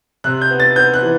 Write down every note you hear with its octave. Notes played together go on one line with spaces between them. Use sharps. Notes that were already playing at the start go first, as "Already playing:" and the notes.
C3 F#6
G6
B3
A6
B3 G6
F#6
E3